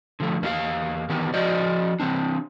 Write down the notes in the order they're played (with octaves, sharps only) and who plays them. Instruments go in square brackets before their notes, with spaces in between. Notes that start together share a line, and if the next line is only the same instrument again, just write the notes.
[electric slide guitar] D3 F3 A3
E2 A#3 D#4 G4 F5
D#3 E3 B3 G4 A#4
F3 F#4 C5 D5 D#5
E3 C4 D4